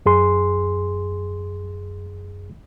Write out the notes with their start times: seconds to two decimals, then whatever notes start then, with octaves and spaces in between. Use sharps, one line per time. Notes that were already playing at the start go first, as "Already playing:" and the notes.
0.06 F#2 G#4 C6